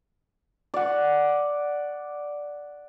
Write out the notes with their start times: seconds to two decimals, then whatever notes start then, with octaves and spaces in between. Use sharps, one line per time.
0.74 D5 F#5